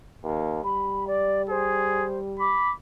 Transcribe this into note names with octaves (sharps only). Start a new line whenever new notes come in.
D#2
G3 B5
D5
G#4 C5
B5 D6